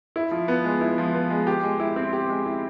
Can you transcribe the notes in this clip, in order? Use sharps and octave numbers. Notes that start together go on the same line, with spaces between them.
E4
F3
B3
G#3
E4
F3
B3
G#3
G4
G#3
E4
C4
G4
G#3
E4